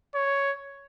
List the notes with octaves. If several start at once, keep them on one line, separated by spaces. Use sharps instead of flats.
C#5